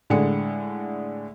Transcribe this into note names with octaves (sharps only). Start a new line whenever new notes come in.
A2 D3 G#3 G#4 C#7